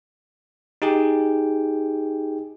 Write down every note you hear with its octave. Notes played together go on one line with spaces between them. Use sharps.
D#4 G4 G#4 G5